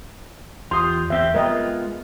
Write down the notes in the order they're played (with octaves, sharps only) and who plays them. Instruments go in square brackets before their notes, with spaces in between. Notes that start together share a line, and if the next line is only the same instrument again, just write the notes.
[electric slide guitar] E2 F4 G4 [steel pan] C6 D#6
[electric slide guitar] E2 C4 G4 [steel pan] E5
[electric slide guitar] G#3 B3 F4 [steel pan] A#4 D#5 G5